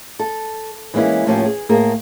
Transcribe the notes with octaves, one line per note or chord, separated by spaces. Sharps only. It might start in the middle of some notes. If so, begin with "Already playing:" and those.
A4
E3 G#3 A#3 C#4 E4
A2 F3 A#3 C#4 G4
G#4
A2 A#3 G#4 A#4